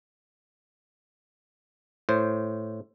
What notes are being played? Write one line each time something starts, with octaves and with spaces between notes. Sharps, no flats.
A2 C5